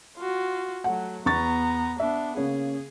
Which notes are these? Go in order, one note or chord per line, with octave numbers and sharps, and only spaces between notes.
F4 F#4
F#3 A3 F#5
E2 B3 A#5 C#6 A6
B3 D4 E5
C#3 A#3 C#4 G#4